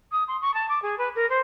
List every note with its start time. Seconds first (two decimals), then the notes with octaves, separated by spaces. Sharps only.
0.11 D#6
0.27 C6
0.41 C#6
0.53 A5
0.69 D6
0.82 G#4
0.97 B4
1.15 A#4
1.29 C5